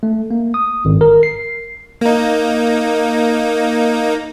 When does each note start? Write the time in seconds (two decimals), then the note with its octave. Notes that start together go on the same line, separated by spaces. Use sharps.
0.03 A3
0.31 A#3
0.54 D#6
0.85 G#1
1.01 A#4
1.23 C7
2.01 A#3 D#4